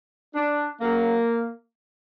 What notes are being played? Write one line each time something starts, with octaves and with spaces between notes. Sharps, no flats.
D4
C#3 F#3 A#3